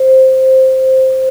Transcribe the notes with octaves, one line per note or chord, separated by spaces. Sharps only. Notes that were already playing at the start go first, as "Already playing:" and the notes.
Already playing: C5